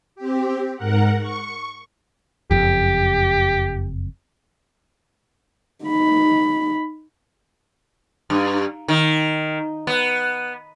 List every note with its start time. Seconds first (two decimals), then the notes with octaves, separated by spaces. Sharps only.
0.16 C4 G4
0.76 G#2 A#4 F#5
1.20 C#6
2.51 F#1 F2 G4
5.85 D#4 B5
8.30 G2
8.88 D#3
9.87 B3